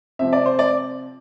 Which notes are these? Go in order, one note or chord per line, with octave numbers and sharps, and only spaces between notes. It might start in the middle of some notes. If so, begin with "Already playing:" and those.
C3 F3 C4 E5
D5
C5
D5